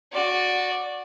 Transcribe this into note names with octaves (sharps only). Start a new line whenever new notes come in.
F#4 D5